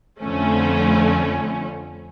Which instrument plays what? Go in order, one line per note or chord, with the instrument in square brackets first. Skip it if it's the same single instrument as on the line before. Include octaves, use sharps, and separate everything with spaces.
[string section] F2 D3 A3 C#4